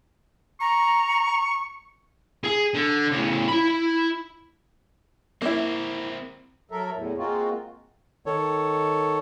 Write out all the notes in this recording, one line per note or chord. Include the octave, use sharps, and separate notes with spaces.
A#5 C#6
G#4
D3
A2 C#3
E4 B5
A#3 C4 E4 A#4
F#3 A4 A#4 E5
E2 A2
G#3 A#3 C4 F4 F#4
D#3 A4 C#5